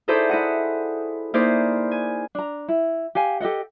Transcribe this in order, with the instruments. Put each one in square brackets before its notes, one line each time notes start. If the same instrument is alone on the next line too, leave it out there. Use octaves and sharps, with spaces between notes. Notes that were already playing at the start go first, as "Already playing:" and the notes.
[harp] D#4 E4 G#4 A4 C5 D5
E4 D#5 F#5
A#3 D#4 E4 G#4 C5 D5
G#5
[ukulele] D4 A#5
E4
G4 F5 G#5
G4 A4 D#5 F#5